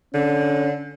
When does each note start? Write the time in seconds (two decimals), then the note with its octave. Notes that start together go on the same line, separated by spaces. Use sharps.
0.14 D3 C#4